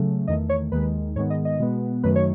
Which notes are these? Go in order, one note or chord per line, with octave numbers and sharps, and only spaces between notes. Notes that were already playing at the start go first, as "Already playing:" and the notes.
Already playing: C#3 F#3 A3
E2 D#3 A3 D#5
C#5
D#2 D#3 G#3 B4
G#2 D#3 G#3 B3 C#5
D#5
D#5
B2 G#3 B3
F#2 D#3 F#3 A3 B4
C#5